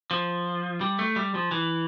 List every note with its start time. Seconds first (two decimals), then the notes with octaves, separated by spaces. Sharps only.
0.11 F3
0.81 G3
0.99 A3
1.16 G3
1.35 F3
1.51 E3